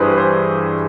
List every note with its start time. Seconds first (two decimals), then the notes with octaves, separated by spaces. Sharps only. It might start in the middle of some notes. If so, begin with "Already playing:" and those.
Already playing: G2 E3 G4 G#4 B4 C5
0.11 B4
0.18 C5